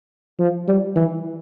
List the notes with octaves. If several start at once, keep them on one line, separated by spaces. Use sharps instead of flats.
F3
G3
E3